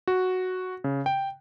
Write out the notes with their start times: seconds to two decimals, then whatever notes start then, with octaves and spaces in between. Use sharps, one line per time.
0.07 F#4
0.84 C#3
1.06 G5